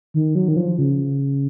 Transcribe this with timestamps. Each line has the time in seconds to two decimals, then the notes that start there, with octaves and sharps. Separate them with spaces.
0.14 D#3
0.35 F#3
0.48 D#3
0.56 F3
0.79 C#3